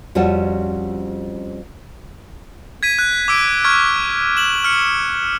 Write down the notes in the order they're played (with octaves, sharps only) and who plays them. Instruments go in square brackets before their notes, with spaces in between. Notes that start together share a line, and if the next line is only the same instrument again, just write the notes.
[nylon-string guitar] F2 G3 C#4 F4 F#4 A5
[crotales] G#6 B6 D#7
F#6
D6 E6 D7
C#6 F6 G#6
E7 F#7
F6 C#7